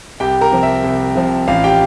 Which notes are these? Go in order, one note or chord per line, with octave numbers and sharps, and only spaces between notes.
C2 G4 G5
A#4 A#5
C3 F3
E5
C2
C3 F3
A1 F4 F5
G4 G5